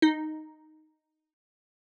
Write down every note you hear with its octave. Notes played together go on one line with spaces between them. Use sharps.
D#4